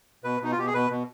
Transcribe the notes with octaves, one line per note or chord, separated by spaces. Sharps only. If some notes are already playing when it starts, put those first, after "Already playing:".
B2 B4
B2 D#4
F4
B2 G4
G#4
B2 B4
B2